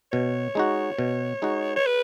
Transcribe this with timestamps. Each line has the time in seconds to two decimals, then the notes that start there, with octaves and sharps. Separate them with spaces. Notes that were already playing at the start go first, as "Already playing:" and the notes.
0.12 B2 C#5
0.55 G#3 D#4 F#4
0.98 B2
1.42 G#3 D#4 F#4
1.76 C#5
1.86 B4